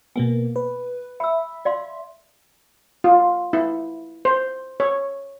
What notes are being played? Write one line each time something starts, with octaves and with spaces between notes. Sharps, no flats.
B2 A#3 B3 G#5
B4
E5 B5 E6
D5 F5 C6
F4
E4
C5
C#5